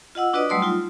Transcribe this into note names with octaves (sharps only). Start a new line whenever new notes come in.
F4 D#5 F#5 E6
D4 F#4 B4 D5 D#5 D#6
F#3 G3 A3 C6 D#6 E6
D#4 F4